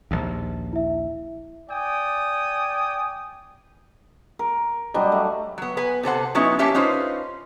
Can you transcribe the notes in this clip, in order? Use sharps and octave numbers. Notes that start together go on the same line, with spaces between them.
A#1 D#2
E4 E5
D5 G5 G#5 D#6
A#4
F#3 G3 D4 D#5
A3
F#3 B3
B3 B4 G#5
C3 A4 C5 F#5
F#3 B3 C#4 D#4 E4
A#3 C#4 G4 C#5 E5 A5
C#4 D#4 F4 B4 C5